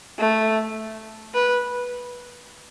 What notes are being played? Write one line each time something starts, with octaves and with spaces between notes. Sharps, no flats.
A3
B4